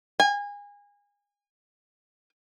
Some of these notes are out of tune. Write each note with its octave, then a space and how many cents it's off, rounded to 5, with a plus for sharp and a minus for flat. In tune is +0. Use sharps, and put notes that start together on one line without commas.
G#5 -30